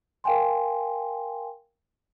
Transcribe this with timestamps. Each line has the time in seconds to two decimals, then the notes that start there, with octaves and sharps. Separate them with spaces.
0.24 A#4 F5 G5 G#5 C6